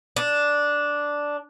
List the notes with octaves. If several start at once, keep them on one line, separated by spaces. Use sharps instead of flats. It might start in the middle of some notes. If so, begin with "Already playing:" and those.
D4